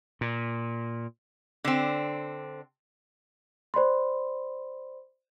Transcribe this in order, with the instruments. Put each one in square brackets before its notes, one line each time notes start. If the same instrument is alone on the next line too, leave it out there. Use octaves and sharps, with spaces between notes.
[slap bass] A#2
[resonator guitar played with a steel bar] D3 C4
[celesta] C5 D5 B5 C6